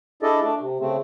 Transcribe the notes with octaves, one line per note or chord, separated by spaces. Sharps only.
D4 E4 G#4 A4 D5 D#5
A3 D4
C3
C#3 A3 C4